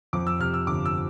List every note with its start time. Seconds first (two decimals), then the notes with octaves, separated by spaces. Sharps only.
0.13 F2 D6
0.27 E6
0.39 C3 F6
0.54 E6
0.67 G1 D6
0.85 E6